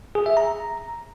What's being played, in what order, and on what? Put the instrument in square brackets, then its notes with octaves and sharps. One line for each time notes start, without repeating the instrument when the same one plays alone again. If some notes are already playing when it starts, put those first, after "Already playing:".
[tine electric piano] G#4
E5
A#5